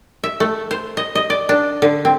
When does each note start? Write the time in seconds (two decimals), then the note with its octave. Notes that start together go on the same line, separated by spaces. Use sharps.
0.24 E5
0.40 A3
0.71 C5
0.97 D#5
1.15 D#5
1.30 D5
1.49 D4
1.82 D3
2.05 C4